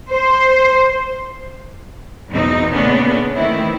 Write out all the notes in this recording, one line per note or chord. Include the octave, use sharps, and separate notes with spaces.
C5
E2 B2 C4 D#4
A#2 C#3 A3 B3 C#4 D4
D#3 E3 A3 C4 E4